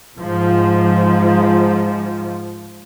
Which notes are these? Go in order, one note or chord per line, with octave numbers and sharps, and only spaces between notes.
G#2 F3